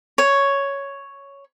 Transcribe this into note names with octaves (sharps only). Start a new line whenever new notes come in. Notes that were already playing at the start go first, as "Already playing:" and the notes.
C#5